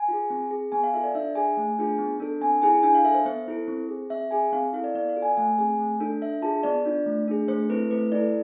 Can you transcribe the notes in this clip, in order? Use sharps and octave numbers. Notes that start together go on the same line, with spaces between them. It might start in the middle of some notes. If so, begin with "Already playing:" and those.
Already playing: G#5
F4 G#4
C4
G#4
B3 G#5
F5
F4 A4 E5
D5
D4 E5
G#4 G#5
A3
D4 F4 G#4
B3
D4 A4
C4 G#5
E4 G#4 G#5
D4 G#5
F5
A4 E5
C5
B3 C5
E4 A4
C4
G#4
C4 E5
G#4 G#5
C4 F5
E4 A4 F5
D5
B3 D5
F5
F4 A4
G#5
A3 G#5
C4 G#4 G#5
A3
D4 A4
D4 E5
F4 G#4 A5
B3 D5
D4 F4
A3
D4 G#4
A3 C5
C4 E4 A4 B4
A3 B4
E4 A4 D5